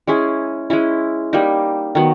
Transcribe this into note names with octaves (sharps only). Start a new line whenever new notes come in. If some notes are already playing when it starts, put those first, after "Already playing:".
G#3 C#4 E4 G#4
G#3 C#4 E4
G3 A#3 D#4
D#3 F#3 B3